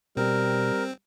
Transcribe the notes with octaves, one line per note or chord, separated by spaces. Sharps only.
B2 G3 C4 A#4